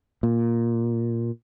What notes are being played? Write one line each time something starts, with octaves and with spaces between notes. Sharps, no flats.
A#2